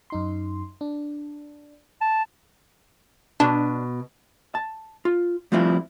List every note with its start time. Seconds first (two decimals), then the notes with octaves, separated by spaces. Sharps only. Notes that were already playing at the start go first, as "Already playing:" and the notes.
0.10 F#2 D#4 C6
0.81 D4
2.01 A5
3.40 B2 D4
4.55 A5
5.05 F4
5.52 F3 G3 A3 C4 E4 F4